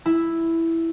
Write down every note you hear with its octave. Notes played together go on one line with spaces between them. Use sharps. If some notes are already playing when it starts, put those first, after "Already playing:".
E4